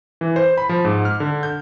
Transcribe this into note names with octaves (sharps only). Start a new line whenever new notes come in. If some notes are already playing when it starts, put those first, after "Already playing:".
E3
C5
B5
F3
G#2
F6
D3
G6